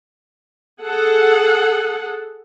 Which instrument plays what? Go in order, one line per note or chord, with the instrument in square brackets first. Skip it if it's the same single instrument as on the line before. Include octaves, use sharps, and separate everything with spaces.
[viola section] G#4 A4 F#5